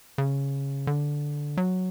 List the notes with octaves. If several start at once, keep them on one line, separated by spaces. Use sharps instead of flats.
C#3
D3
F#3